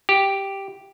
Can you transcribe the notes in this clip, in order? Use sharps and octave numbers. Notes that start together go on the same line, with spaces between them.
G4